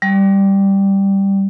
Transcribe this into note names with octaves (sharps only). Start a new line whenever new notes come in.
G3